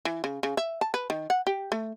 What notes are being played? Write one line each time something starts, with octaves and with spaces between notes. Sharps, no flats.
E3
C#3
C#3
E5
A5
B4
D#3
F#5
G4
A3